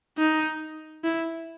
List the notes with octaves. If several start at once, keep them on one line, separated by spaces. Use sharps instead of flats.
D#4
E4